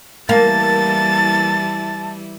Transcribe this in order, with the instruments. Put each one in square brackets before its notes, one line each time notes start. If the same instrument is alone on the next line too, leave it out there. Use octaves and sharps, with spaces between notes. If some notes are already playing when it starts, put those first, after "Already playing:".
[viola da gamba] E3 G3 E4 [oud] A#3 [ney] A5 [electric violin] A6